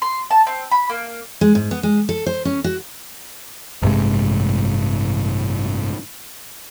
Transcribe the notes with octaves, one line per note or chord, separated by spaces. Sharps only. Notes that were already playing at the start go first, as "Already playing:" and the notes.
C6
A5
C4
B5
A#3
G#3
G#2
B3
G#3
A4
C5
C#4
F#4
A1 G2 C3 G#3